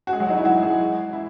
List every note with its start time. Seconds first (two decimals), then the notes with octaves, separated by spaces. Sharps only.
0.07 F#4
0.13 G#3 G#4
0.20 F#3 F#4
0.29 D#4
0.38 E3 E4
0.45 F#3 F#4
0.62 G#3 G#4
1.12 E3 E4